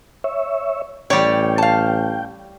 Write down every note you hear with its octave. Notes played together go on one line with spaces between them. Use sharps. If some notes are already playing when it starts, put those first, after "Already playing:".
C#5 E5
A1 G3 C#5 D5 G5
F5 A5